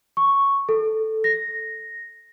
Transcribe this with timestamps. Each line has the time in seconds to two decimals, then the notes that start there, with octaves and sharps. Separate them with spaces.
0.17 C#6
0.69 A4
1.24 A#6